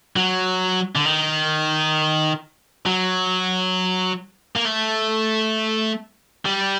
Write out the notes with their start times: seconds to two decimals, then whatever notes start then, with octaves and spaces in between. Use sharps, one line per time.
0.16 F#3
0.96 D3
1.05 D#3
2.86 F#3
4.57 A#3
4.66 A3
6.46 G3